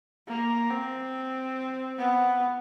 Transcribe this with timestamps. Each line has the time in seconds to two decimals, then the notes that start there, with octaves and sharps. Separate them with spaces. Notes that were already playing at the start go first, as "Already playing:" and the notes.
0.27 A#3
0.70 C4
1.98 B3